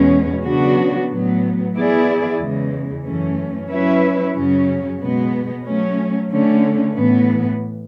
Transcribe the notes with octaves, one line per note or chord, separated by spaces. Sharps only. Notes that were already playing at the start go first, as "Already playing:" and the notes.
Already playing: E2 B2 G#3 C#4
C#3 F#3 B3 D4 F#4
A2 F#3 B3
E3 B3 E4 G#4 D5
E2 C#3 E3 G#3
F#2 E3 A3 C#4
F#3 C#4 E4 B4 E5
F#2 C#3 F#3 C#4
B2 G#3 B3
F#3 A3 C#4
D3 A3 C#4
A2 E3 B3